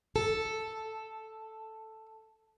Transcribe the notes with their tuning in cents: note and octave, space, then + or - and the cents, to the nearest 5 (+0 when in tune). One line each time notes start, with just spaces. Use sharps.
A4 +0